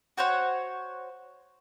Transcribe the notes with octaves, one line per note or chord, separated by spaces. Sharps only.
F#4 C5 C#5 F#5